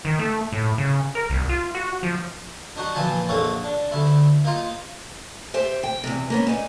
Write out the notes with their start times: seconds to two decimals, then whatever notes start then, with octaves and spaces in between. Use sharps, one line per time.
0.05 D#3
0.19 A3
0.52 A2
0.78 C#3
1.15 A#4
1.30 C2
1.49 F4
1.75 F#4
2.03 F3
2.76 D4 D#4 F#4 F#5
2.95 A#2 E3 F3 G#5 A5
3.29 A#1 F2 A3 A#3 C#5 F#5
3.64 D4
3.91 D2 A3 E4
4.44 A#3 D#4 F4
5.54 G4 C5 E5
5.83 G5
6.04 E2 C3
6.30 A#3 B3 C#4
6.47 A#2 D#4